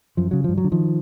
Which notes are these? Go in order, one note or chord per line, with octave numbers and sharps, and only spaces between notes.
F#2 F3
C#3 F#3
G2 F3
F#3
D3
D#3 F3